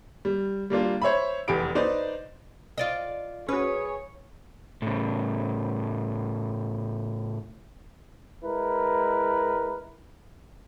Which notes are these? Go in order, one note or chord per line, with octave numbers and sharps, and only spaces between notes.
G3
G3 A#3 D4 F4
C5 C#5 E5 B5
F1 E2 G4 B5 D7
D#4 B4 C5 D5
F4 D5 D#5
C#4 F#4 G#4 B4 C#5
A2 C#3
G#3 E4 A#4 B4